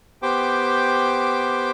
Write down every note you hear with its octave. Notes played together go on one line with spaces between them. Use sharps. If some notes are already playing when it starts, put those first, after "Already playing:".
B3 G4 C5 G5 D6